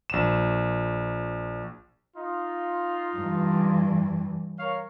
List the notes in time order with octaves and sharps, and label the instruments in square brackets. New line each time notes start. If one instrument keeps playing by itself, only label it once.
[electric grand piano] A#1 E7
[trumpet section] D#4 F4
[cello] G2 E3
[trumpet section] A#4 C#5 F5